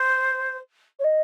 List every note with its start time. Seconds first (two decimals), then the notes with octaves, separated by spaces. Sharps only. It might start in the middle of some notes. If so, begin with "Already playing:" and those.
Already playing: C5
0.99 C#5
1.04 D#5